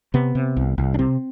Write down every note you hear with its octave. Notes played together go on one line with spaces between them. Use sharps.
C3 B3
C3
C2
C2
D4
C3 C4